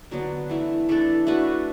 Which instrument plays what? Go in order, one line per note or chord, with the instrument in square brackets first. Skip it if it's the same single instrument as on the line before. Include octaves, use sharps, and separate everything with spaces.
[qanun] D3 F#3 B3 D4
E3 A3 E4
E3 A3 D4 A4
A3 D4 F#4 B4